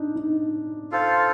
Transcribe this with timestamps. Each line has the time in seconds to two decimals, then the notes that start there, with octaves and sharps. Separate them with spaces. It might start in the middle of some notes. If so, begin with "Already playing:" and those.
Already playing: D4 D#4
0.16 D#4
0.91 F4 A4 C5 F5